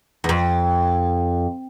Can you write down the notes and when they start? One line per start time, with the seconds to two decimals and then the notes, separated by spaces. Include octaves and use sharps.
0.24 E2
0.29 F2